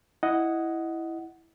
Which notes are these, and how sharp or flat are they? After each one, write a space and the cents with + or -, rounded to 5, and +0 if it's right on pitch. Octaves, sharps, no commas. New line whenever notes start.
E4 +0 D#5 +5 F#5 +0